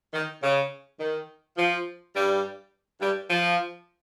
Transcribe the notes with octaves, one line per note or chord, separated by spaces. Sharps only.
D#3
C#3
D#3
F3
G2 G3
G2 G3
F3